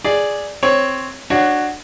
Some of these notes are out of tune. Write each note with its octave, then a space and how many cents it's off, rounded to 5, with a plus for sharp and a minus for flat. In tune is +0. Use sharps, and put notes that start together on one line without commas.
G#4 +0 D5 +0
C4 +0 C#5 +0
D4 +20 F#4 +0 C#5 +0